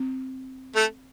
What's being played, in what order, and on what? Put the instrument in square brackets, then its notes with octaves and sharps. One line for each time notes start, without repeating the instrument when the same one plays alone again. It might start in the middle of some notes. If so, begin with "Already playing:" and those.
Already playing: [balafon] C4
[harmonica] A3 A4